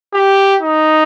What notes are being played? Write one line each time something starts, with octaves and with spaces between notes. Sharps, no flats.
G4
D#4